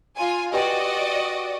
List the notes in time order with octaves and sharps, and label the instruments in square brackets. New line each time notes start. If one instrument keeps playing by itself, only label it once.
[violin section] F4 G#5
[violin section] F#4 D5 D#5 [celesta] G4 B4 G5